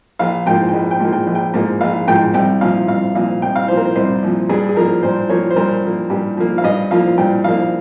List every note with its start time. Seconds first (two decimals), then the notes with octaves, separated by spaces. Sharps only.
0.19 A#1 F5
0.46 G#2 F3 A#3 G5
0.68 G5
0.74 A#1
0.91 G5
1.00 G#2 F3 A#3
1.13 G5
1.27 A#1
1.35 G5
1.54 G#2 F3 A#3
1.81 A#1 F5
2.08 G#2 F3 A#3 G5
2.34 C2 G5
2.61 A#2 F3 F5
2.88 C2 F5
3.15 A#2 F3 F5
3.42 C2 G5
3.56 F5
3.68 A#2 F3 C5
3.77 A#4
3.82 C5
3.95 C2 C5
4.23 A#2 F3
4.49 G2 G#4
4.69 G#4
4.76 F3 A#3 A#4
5.03 G2 C5
5.29 F3 A#3 C#5
5.51 C5
5.56 G2 A#4
5.84 F3 A#3
6.10 G2 G4
6.37 F3 A#3
6.58 F5
6.64 G2 D#5
6.91 F3 A#3 F5
7.18 G2 G5
7.44 F3 A#3 F5